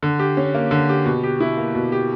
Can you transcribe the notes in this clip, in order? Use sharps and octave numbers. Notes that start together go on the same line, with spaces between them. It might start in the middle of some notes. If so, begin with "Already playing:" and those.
D3
G4
C#4
A#3
D3
G4
B2
G4
E4
A#3
B2
G4